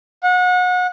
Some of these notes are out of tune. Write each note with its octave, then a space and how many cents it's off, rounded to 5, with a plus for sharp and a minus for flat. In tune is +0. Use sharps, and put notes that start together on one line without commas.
F#5 -30